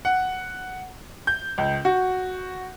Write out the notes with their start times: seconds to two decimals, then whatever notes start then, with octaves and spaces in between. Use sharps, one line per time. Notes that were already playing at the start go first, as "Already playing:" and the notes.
0.05 F#5
1.27 G6
1.58 C#2
1.85 F#4